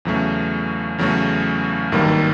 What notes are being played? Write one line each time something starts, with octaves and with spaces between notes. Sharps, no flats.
E2 C#3 F#3 A3 C#4
E2 C#3 F#3 A3 C#4
G#1 G2 D#3 F#3 A#3